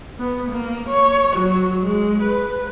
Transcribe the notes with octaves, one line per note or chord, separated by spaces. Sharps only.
B3
A#3
C#5
F#3
G#3
B4